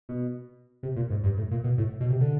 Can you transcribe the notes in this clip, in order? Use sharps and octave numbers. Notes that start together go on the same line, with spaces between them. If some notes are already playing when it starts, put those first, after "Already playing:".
B2
C3
A#2
G#2
G2
A2
A#2
B2
A2
B2
C3
D3